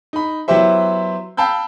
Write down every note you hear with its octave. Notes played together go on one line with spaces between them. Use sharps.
D#4 B5
F#3 B3 E4 G4 C5 E5
F5 G5 A5 B5 E6 G6